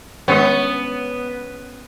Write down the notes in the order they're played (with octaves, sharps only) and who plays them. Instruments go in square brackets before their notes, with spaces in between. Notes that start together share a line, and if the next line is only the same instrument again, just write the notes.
[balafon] D#3 G#3 [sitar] B3 [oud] C#4